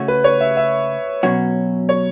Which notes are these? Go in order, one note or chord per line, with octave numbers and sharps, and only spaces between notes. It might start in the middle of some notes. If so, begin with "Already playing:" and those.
Already playing: C#3 A3 C#4 F#4
B4
C#5
E5
E5
B2 F#3 C#4 F#4
C#5